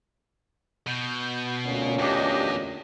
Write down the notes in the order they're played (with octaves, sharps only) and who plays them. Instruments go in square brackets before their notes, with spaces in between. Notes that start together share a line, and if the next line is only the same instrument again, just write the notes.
[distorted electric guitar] B2 [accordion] G6
[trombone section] D2 A#2 C#4
[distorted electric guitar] E2 [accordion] D4 G4 D#5